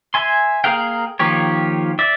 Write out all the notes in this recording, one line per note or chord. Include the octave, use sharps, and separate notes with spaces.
E5 G#5 C6
A#3 G#4 A#4 F5 G5
D#3 F3 A#3 G4 C#5
D5 E5